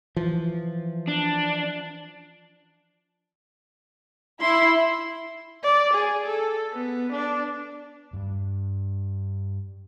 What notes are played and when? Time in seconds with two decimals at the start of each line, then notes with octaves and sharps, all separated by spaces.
0.16 E3 F3
1.08 D4
4.42 E4 C6
5.64 D5
5.94 G#4
6.26 A4
6.74 B3
7.13 D4
8.13 G2 G3